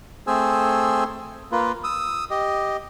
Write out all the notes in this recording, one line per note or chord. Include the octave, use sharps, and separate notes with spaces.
A3 C4 G#4 C5 G#5 E6
A#3 F4 B4
D#6 E6
G4 D#5